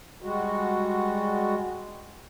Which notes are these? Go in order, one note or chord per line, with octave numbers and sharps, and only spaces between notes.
G3 G#3 F#4